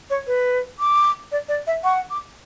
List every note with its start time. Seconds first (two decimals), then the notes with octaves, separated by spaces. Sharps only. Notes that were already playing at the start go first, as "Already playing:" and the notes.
0.10 C#5
0.27 B4
0.79 D6
1.32 D5
1.48 D5
1.67 E5
1.84 F#5 C#6
2.10 D6